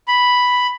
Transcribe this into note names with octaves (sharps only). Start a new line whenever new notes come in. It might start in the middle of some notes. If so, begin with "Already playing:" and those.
B5